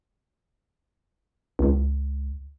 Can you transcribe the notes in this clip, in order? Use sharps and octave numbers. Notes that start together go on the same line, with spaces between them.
C#2